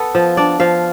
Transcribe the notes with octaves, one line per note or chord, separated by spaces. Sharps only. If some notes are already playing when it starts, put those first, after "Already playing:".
Already playing: B3 A4
F3
D4 D5
F3 F5